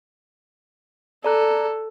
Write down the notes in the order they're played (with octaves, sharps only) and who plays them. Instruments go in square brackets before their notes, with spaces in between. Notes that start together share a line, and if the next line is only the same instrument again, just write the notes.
[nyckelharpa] A4 [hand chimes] D5 A#5 F#6